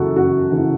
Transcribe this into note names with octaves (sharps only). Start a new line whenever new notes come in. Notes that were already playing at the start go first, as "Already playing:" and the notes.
Already playing: F#2 C#3 E3 F#4 A4
F#2 F#4
C#3 E3